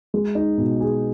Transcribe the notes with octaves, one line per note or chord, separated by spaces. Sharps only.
G#3
D#4
B2
G#4